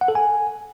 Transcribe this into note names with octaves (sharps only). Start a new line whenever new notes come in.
F#5
A4
G#5